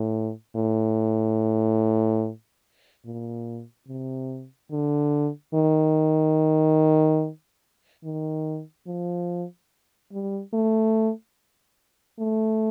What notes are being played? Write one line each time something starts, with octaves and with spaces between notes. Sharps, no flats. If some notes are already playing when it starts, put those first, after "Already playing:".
Already playing: A2
A2
A#2
C3
D3
D#3
D#3
F3
G3
A3
A3